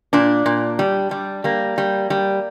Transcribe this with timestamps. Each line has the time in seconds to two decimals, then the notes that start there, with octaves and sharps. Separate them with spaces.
0.13 A#2 D4
0.46 A#2
0.79 G3
1.11 G3
1.44 G3 A#3
1.78 G3
2.10 G3